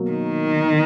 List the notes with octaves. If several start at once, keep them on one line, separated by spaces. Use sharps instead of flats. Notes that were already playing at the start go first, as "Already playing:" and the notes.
Already playing: B2 F#3 A#3
D#3